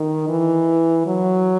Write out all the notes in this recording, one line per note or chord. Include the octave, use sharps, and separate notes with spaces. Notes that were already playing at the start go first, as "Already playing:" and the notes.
Already playing: D#3
E3
F#3